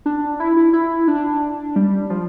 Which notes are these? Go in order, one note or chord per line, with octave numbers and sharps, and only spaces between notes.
D4
E4
E4
E4
D4
G3
F3